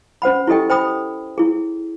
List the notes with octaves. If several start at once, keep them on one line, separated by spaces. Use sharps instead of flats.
C#4 C5 F#5 B5
E4 G4 A4 D#5 G5
C5 G5 B5 D#6
E4 G#4